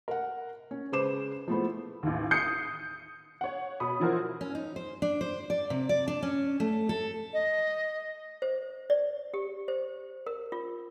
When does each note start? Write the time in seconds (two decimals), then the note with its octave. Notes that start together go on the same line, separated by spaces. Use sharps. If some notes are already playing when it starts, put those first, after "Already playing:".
0.08 A#4 F#5
0.71 C#4
0.92 C#3 G#3 B4 C5 D6 E7
1.48 F3 G#3 A3 B3 E4 C5
2.03 A1 D#2
2.31 D#6 G6 C7 C#7
3.41 C#5 F#5
3.80 B2 B5 D#6
4.00 E3 F3 E4 F#4 A#4 C5
4.41 C#4
4.55 D#4
4.76 C5
5.02 D4
5.21 C5
5.50 D5
5.70 C3
5.89 D5
6.08 D4
6.23 C#4
6.60 A3
6.89 A4
7.33 D#5
8.42 C5
8.90 D5
9.34 G4
9.68 C5
10.27 A#4
10.52 F4